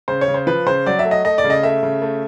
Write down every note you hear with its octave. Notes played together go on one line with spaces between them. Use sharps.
C#3 C5
C#5
C#3
C5
F3 B4
C#3 C5
F#3 D5
E5
A3
D#5
A3 D#5
D5
C#3
D#5
A3 E5
C#3
A3